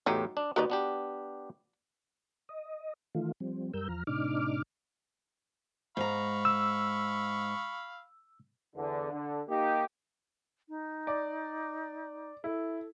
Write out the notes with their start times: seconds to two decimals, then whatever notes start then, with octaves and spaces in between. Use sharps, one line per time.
0.06 E2 A2 F#3 D#4 G4
0.37 D4
0.56 D#2 D#4 F#4 B4 D5
0.70 B3 D4 G4
2.49 D#5
3.15 D#3 E3 A3 F4
3.40 F3 G3 C4
3.73 F#2 G3 A#4 E6 G6
3.88 E2 F3 A#5 F6
4.07 A2 C3 D4 D#4 D6 F6
5.97 G#2 F5 A#5 B5 C#6
6.45 E6
8.76 E2 D3
9.12 D3
9.48 A#3 D#4 G4
10.69 D#4
11.07 D5
12.44 E4 A4